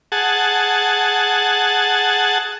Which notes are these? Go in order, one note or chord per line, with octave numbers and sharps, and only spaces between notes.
G#4 F#5 A5